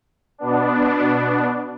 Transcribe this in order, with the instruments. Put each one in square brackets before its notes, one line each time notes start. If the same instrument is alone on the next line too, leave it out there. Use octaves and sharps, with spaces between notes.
[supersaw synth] B2 B3 D4